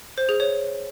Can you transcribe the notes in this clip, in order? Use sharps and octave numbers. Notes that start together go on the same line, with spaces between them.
C5
G#4
C#5